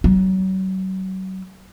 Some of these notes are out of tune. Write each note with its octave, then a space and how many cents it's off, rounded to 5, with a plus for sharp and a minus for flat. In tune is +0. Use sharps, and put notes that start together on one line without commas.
F#3 +35